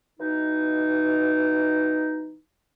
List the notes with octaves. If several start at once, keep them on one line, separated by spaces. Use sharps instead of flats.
B2 E3 D#4